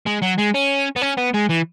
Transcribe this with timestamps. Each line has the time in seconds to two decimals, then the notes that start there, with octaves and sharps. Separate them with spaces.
0.07 G#3
0.22 F#3
0.38 G#3
0.55 C#4
0.96 B3
1.02 C#4
1.17 B3
1.34 G#3
1.49 E3